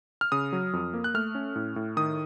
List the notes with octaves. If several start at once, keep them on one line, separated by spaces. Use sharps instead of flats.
F6
C#3 D#6
F#3
F2
A#3
F#6
A3 F6
C#4
A2
A2
D#3 D#6